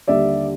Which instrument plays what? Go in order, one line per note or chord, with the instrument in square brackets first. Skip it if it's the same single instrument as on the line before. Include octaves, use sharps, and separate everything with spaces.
[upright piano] D#2 D3 G3 D5 E5